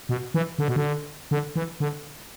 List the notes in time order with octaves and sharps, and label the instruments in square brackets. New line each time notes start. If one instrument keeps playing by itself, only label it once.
[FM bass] B2
E3
D3
B2
D3
D3
E3
D3